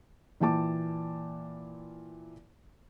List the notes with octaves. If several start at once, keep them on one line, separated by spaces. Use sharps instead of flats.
A#2 E3 G5 A5 D6